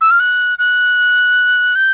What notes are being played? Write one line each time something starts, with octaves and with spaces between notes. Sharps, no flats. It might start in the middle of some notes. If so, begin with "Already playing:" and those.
E6
F6
F#6
F#6
G6